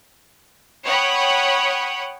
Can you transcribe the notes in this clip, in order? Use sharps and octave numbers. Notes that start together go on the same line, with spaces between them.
C#5 F#5 G5 B5 D#6